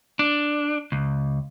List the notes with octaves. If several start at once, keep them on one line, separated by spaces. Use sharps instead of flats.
D4
C#2